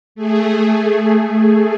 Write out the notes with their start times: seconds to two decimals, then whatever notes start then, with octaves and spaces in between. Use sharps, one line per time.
0.15 A3 G#4